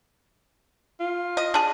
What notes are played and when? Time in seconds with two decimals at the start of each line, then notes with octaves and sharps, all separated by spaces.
1.00 F4
1.37 D#5
1.54 D4 G#4